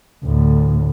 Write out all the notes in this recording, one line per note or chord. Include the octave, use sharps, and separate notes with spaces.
D2 A2